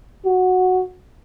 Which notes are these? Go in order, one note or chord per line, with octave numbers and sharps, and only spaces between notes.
F#4